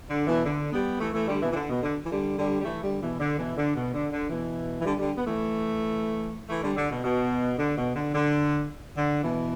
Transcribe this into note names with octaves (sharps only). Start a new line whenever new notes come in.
D3
B2 E3
D3
G3 B3
E3 A3
E3 A3
D3 G3
B2 E3
E3
D3
B2
D3
E3
D3 G3
D3 G3
G3
E3 A3
D3 G3
B2 E3
D3
B2 E3
D3
B2
D3
D3
B2 E3
E3
D3 G3
D3 G3
B3
E3 A3
E3 A3
D3 G3
D3
B2
B2
D3
B2
D3
D3
D3
B2 E3